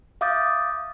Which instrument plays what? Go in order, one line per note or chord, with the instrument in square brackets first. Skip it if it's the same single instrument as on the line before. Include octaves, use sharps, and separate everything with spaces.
[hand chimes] E5 F5 D6 D#6 G6 A6